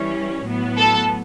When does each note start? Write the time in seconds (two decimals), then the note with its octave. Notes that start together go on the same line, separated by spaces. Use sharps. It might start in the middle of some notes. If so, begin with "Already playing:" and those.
Already playing: E3 G3 C#4
0.45 A2 F#3 B3
0.77 A4 A5